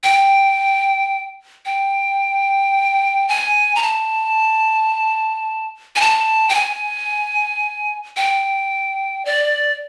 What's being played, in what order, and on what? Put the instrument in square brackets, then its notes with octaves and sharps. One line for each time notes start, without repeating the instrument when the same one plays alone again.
[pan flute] G5
G5
G#5
A#5
A5
G#5
A5
G5
G#5
G5
D5